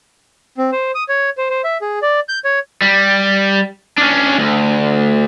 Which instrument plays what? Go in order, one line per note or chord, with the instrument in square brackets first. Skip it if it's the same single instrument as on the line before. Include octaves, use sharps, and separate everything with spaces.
[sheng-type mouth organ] C4
C5
D#6
C#5
C5
C5
E5
G#4
D5
G6
C#5
[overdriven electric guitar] G3
C#4 D4
D2